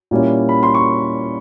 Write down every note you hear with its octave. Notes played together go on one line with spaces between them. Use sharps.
A#2 G3 A#3 C#4 E4
B5
C6
C#6